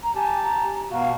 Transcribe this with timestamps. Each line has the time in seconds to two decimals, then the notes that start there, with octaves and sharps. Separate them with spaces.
0.03 A#5
0.15 G4 G#5 A5
0.42 A#5
0.90 B2 F#4 F5